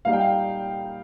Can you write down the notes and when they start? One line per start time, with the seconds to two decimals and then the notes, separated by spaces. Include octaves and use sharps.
0.05 A#2 G3 A#3 D#4 F5
0.13 G5
0.21 F5